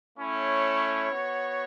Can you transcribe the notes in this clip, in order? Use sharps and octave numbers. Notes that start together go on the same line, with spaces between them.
A3 C#4 E4 C#5
B3 F#4